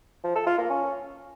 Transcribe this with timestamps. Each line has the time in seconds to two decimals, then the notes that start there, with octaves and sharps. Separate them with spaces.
0.24 F3
0.35 A4
0.47 F4
0.58 A#3
0.70 C#4